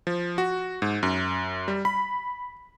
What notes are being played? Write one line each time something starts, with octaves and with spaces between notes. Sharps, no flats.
F3
F#4
G#2
F#2
G3
B5